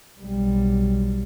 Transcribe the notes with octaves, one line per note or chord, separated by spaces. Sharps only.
B1 G3